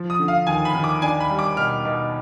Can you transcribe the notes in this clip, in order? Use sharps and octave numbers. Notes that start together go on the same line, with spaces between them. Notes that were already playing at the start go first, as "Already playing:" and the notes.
Already playing: F3
D#6
D3
F5
D#2 G#5
B5
D#2
D6
D4 G#5
B5
G3
D6
B2 F6
B2